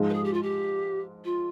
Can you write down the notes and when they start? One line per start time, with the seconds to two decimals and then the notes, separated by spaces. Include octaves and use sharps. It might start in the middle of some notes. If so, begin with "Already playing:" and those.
Already playing: G#2 F3 G#3
0.09 B4
0.13 G#4
0.24 G4
0.33 F4
0.42 G4
1.25 F4